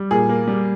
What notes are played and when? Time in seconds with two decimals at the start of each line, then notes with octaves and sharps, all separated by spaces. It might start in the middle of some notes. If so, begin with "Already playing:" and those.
Already playing: G3
0.11 A#2 G#4
0.29 A#3
0.48 G3